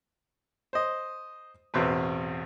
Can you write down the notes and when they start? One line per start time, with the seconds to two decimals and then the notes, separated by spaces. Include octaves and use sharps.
0.73 C5 D#5
1.74 A1 E2 B2 C4 B4